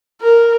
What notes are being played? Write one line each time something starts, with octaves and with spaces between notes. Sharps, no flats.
A#4